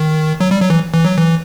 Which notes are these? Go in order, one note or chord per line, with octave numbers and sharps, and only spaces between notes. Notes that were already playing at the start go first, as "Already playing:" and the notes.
Already playing: D#3
F#3
G3
F#3
E3
E3
F#3
E3